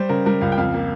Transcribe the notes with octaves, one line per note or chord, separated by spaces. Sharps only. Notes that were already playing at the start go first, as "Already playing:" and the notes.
Already playing: G3 C5
C#3 A#4
G3 A#4
C#2 F5
G5
F2 F5
A#3